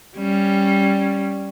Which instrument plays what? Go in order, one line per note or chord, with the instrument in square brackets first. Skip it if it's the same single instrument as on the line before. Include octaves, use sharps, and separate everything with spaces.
[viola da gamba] G3 C#4